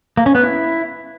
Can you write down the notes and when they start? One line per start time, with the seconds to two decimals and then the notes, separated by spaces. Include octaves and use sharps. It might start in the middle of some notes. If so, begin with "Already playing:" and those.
0.17 A#3
0.26 C#4
0.35 B3
0.43 E4